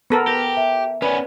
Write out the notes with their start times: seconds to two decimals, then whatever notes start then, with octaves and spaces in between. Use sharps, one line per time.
0.10 B3 A4 A#4
0.27 G4 A#6 F7
0.57 E5
1.02 B3 C#4 A#4 B4 D5